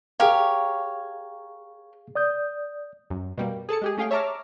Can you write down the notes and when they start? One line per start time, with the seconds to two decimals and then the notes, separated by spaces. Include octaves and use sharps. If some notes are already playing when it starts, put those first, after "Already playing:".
0.20 G4 G#4 A#4 C#5 F5
2.15 D5 D#6 G6
3.10 F#2
3.38 B2 G3 A#3
3.69 G#4 A4 A5 C#7
3.82 G#3 G4 G#4
3.97 A3 C#4 G#4 F5 G5
4.11 C#5 E5 A5 A#5 D6 F6